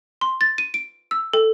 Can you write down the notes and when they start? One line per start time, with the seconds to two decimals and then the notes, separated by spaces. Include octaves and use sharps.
0.21 C6
0.41 A6
0.58 D#7
0.74 D7
1.11 E6
1.33 A4